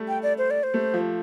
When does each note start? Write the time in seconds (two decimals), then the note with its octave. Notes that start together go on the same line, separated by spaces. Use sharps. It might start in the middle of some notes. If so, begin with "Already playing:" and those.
Already playing: G3 A3
0.08 G5
0.23 D5
0.38 C5
0.51 D5
0.63 C5
0.74 A3
0.94 F3